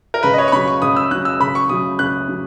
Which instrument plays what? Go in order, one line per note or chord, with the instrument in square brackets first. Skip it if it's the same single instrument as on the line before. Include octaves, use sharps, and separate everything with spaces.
[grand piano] A#4
[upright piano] C#2 [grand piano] B4
[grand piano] D#5
C#5
C#6
[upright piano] C#3 F#3 [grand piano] B5
[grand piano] C#6
[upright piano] C#2 [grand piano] D#6
[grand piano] E6
[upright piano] C#3 F#3 [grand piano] F#6
[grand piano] E6
[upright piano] C#2 [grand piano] B5
[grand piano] C#6
[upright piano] C#3 F#3 [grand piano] D#6
[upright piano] C#2 [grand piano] F#6
[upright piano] C#3 F#3